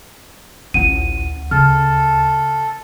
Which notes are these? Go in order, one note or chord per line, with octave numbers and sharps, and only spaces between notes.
A1 D2 F4 F#5 D#7
C#3 A4 F6